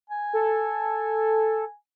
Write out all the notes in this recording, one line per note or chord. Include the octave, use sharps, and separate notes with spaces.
G#5
A4